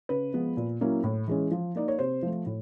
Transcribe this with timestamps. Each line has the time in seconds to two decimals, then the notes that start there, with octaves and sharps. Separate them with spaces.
0.09 C#3 B4
0.33 F3 G#3 B3
0.57 A#2
0.81 F#3 A#3 C#4 E4
1.04 A2
1.28 E3 G#3 C#4
1.51 F3
1.76 A#3 D#4 D5
1.88 C#5
1.99 C3 C5
2.23 F3 A3
2.46 A2